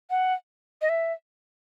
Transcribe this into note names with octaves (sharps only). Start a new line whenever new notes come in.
F#5
D#5
E5